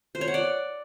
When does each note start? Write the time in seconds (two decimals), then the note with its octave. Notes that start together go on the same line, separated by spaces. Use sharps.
0.15 C5
0.21 C#5
0.28 F#5
0.34 D5